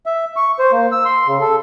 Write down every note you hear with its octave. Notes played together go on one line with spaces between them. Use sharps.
E5
C#6
C5
A#3
E6
C6
C#3
A4